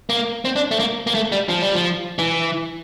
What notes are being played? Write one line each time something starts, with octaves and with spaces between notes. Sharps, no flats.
A#3
C4
D4
A3
A#3
A#3
A3
G3
F3
G3
F3
E3